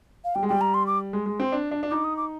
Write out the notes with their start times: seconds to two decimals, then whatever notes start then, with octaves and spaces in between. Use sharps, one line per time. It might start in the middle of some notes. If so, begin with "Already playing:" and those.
0.25 F5
0.35 G3 G5
0.43 G#3
0.49 G3 G5
0.61 A#5
0.74 C6
0.87 D6
1.13 G#3
1.26 G#3
1.40 C4
1.52 D4
1.71 D4
1.83 D4
1.90 D#4 D6
2.04 D#6
2.17 D6